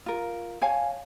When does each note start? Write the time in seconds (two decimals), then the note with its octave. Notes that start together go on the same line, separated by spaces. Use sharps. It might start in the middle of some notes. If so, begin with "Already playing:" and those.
0.06 F4 A#4
0.62 C#5 F5 G#5 A5